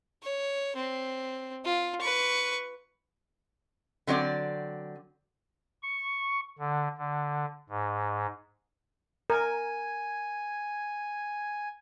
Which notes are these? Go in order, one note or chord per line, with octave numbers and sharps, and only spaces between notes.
C#5
C4
F4
B4 C#6
D3 F#3 C4 D5
C#6
D3
D3
G#2
A#4 G#5